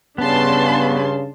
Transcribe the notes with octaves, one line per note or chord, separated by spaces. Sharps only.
G2 C#3 B3 D4 A5 C6